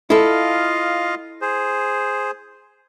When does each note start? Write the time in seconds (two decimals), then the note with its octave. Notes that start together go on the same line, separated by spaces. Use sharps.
0.10 E4 F4 A4 D#5 F5
1.41 G#4 C5